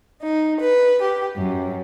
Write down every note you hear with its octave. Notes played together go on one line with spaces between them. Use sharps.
D#4
B4
G4
F#2